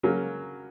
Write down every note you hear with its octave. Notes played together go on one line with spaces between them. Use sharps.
C#3 F#3 A#3 C#4